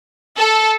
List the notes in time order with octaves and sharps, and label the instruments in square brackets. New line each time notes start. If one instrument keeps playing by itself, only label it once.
[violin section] A4